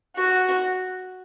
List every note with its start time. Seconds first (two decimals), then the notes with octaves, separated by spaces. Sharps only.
0.17 F#4